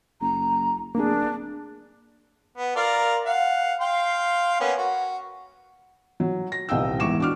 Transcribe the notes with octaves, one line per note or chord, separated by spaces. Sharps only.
F#1 A#5
D1 A#3 D4 G#4
B3
F4 A#4 D5
F5 F#5
F5 G5 C6
A#3 B3 C#4
F#4
F#3
A#6
D#1 C2 D#5 F5 G5 E6
E2 G#2 E3 C#6 D6 E7
D4 F#4 D6 F6